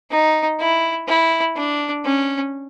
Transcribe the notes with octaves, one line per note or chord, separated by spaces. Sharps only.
D#4
E4
E4
D4
C#4